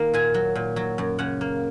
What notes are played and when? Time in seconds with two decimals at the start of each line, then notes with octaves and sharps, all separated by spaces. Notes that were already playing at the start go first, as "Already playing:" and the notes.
Already playing: D#3 A#3
0.14 A#2 G#5
0.34 F#3
0.55 A#2
0.76 F#3
0.98 F#2
1.19 C#3 F#5
1.41 A#3